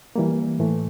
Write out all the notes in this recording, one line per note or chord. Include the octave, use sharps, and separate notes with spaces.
E3 G3 A#3
A2 E3 A3